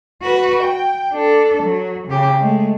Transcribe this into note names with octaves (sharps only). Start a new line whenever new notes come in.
F#4 B4
G5
D4 A4
F#3
C#3 G4
G#3 A3